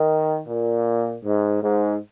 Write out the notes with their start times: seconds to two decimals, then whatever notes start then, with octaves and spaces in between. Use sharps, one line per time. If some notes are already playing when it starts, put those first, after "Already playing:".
Already playing: D#3
0.47 A#2
1.24 G#2
1.62 G#2